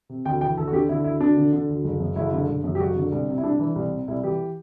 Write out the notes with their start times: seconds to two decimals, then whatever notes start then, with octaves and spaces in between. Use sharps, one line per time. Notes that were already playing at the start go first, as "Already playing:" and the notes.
0.09 C3
0.25 D2 G5
0.41 E3 G5
0.57 D2 A4
0.68 F#4
0.73 D3 G4
0.89 D3 E4
1.04 D2 E4
1.20 D2 D4
1.37 D3
1.53 D3
1.69 D2
1.85 F#1
2.00 F#2
2.16 F#1 E4
2.32 D3
2.48 F#1
2.64 F#2
2.75 G4
2.80 F#1 F#4
2.96 D3
3.12 C2
3.28 C3
3.38 E4
3.43 C2 D4
3.59 E3
3.76 C2
3.91 C3
4.08 C2 E4
4.23 E3 G4